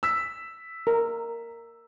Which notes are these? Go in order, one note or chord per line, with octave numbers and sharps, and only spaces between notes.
E6 B6
A#4